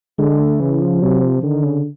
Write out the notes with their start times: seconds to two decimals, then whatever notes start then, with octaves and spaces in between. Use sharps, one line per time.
0.18 D3 G#3
0.39 A3
0.60 C#3 E3
0.81 F3
1.02 C3 F#3
1.22 F3
1.43 D3 D#3
1.63 C#3